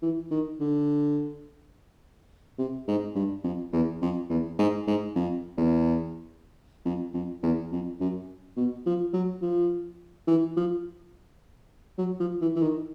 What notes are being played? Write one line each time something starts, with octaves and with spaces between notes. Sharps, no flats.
E3
D#3
D3
C3
G#2
G2
F2
E2
F2
E2
G#2
G#2
F2
E2
F2
F2
E2
F2
F#2
B2
F3
F#3
F3
E3
F3
F#3
F3
E3
E3
D#3